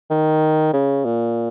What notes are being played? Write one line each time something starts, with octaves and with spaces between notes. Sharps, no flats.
D#3
C#3
A#2